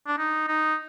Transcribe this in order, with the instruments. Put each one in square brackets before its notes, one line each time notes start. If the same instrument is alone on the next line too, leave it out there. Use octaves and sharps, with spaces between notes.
[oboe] D4
D#4
D#4